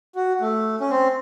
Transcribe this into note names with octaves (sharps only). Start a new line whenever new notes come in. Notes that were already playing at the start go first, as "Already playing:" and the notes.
F#4
A3
C#4
C4